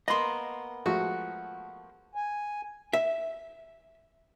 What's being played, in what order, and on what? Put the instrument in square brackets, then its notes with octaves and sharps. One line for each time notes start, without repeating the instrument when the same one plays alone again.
[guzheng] A#3 B3 [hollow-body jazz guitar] D#5 C6
[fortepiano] F3 G#3 A3 [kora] F#4
[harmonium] G#5
[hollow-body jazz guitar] E5